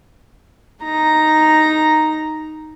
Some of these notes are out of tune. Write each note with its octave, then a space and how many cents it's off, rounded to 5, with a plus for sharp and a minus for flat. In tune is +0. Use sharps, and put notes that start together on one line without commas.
D#4 +0 A#5 +0